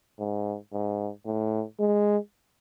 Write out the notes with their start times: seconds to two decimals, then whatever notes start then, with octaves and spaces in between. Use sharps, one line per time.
0.19 G#2
0.73 G#2
1.26 A2
1.80 G#3